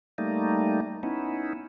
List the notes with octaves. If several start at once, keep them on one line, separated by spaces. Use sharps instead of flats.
G3 A3 A#3 D#4
B3 C#4 D#4 E4